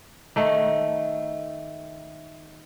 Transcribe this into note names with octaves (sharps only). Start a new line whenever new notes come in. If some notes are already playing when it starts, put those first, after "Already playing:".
D#3 A3